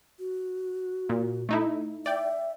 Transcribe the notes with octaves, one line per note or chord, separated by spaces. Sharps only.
F#4
A#2
A3 D#4 E4
D5 E5 G5